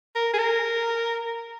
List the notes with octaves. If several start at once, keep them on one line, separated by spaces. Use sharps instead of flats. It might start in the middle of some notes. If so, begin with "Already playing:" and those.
A#4
G#4
A#4